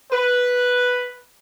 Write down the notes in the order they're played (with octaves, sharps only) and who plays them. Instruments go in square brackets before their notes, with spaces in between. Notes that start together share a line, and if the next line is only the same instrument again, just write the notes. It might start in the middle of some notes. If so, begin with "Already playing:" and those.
[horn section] B4